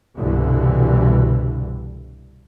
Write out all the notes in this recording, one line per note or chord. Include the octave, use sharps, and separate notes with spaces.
C2 G2 B2 D3 E3